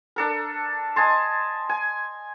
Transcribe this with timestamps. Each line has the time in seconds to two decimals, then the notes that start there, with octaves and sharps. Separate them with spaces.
0.16 D4 A4 A#4
0.96 D#5 G#5 A5 C6
1.69 G#5